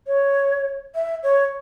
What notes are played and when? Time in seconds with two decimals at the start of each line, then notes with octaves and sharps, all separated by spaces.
0.07 C#5
0.95 E5
1.23 C#5